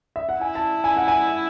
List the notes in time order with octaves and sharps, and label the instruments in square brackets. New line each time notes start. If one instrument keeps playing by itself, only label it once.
[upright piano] E5
F#5
[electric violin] E4 [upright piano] G#5
[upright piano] A5
G#5
F#5
G#5